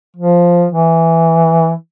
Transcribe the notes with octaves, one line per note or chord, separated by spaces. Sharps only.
F3
E3